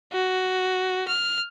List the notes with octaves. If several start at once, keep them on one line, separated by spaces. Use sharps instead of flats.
F#4
F6